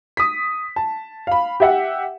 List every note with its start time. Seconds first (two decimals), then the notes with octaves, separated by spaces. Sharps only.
0.17 D#6 B6
0.76 A5
1.27 F5 B5
1.60 G4 E5 F#5